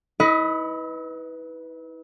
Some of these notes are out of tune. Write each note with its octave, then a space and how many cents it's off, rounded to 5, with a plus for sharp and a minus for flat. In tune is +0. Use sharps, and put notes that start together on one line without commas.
E4 -40 B4 +0 D#5 +20